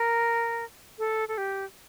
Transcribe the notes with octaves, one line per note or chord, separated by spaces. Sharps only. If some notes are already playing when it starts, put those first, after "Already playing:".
Already playing: A#4
A4
A4
G4